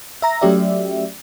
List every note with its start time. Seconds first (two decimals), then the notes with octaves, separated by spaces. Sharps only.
0.22 E5 A#5 A#6
0.41 F#3 A3 C#4 G4 D5 E5